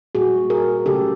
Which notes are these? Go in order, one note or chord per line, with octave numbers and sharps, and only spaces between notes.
A#2 G3 A#3 F#4 G#4
G#4 A#4
C#3 F#3 A3 G4 A4